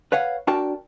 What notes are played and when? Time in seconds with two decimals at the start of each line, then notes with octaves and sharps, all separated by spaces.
0.12 B4 C#5 F5 F#5
0.47 D4 F#4 A#4 D5 G5 A5